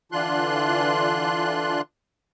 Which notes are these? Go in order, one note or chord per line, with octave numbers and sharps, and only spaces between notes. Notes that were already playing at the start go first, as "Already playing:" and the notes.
D3 E3 D4 F4 C6 F#6